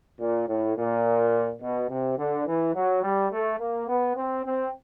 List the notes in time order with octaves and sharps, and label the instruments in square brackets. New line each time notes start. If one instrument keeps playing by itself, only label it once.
[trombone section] A#2
A2
A#2
B2
C3
D3
E3
F#3
G3
A3
A#3
B3
C4
C4